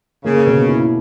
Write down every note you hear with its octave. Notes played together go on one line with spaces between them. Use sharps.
C#3 A#3
B2
E4